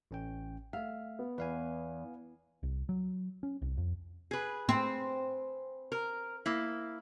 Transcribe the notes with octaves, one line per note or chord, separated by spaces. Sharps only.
A1 C#4 G5
A3 E5 F5
B3
E2 B4 F5 G#5
C2
F#3
C#4
C2
F2
G#4 B4
C4
A#4
A#3 E4